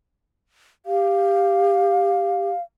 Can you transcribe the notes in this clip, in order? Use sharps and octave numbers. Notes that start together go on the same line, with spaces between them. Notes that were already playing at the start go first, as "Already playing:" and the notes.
G4 F5